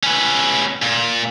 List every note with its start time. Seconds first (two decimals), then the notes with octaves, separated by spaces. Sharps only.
0.03 C#4 B4
0.82 A#2